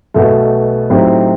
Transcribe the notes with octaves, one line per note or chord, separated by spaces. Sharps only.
B1 B2 A3
A2 F#3 C4 D#4 G4